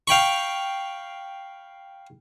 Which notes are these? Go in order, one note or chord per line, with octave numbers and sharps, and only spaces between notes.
F5 G5 B5 C#6